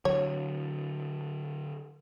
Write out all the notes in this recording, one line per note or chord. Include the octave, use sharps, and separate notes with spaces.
D3 F#3 C#5